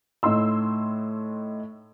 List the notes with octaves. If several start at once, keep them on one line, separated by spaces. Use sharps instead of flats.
A2 D#4 C6 E6